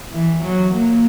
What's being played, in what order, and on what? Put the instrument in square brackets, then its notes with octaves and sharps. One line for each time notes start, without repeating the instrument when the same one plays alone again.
[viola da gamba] E3
F#3
A#3